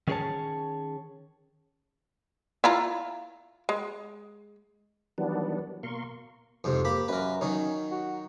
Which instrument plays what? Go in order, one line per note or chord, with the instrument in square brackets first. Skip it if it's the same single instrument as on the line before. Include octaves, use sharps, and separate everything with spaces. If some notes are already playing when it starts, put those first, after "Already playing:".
[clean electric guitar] D#3 C#4 G#4 A#4 C#5 A5
[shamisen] E4 F4 A#5
G#3
[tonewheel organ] D#3 E3 F#3 G3 B3 D4
B2 A#3 A#4 C6 C#6
[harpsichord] F2 G#2 C3
[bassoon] A#3 [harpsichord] G4 B5
[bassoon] F#2 [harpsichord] A#4 B4
[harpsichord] D#3 F#3 D#4 [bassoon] C#4
[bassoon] F#4